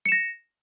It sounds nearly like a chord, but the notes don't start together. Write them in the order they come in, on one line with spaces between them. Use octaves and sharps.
C#7 E7 A#6